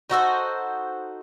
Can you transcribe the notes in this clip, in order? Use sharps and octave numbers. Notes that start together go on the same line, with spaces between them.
D#4 F#4 A4 C5